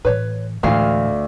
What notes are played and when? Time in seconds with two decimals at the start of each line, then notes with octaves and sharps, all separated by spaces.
0.05 A2 E3 B4 C#5
0.63 D2 A2 E3 G#3 D4 F4 F5